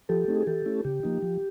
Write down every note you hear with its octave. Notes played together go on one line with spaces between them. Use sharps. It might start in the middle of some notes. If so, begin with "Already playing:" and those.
F3 G4 A4
A3 C4 D#4
G#4
E3 G4 A4
A3 C#4 E4
C#3 G4
F3 A#3 D#4
F3